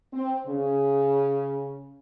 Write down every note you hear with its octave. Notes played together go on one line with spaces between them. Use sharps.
C4
C#3